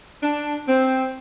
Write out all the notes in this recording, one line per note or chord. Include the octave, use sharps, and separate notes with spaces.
D4
C4